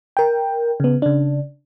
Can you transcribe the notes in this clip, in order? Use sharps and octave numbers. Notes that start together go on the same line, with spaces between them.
A#4 G5
C#3 B3
C#3 D4